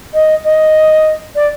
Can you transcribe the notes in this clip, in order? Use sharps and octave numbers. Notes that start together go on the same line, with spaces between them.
D#5
D#5
D5